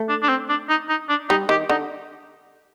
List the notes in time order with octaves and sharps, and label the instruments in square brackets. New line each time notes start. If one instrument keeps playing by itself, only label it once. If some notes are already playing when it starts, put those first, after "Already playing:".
Already playing: [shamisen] A3
[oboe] D4
D4
C4
D4
D#4
D#4
D4
[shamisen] G3 [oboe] D#4
[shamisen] D#3 [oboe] G4
[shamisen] D3 [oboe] D#4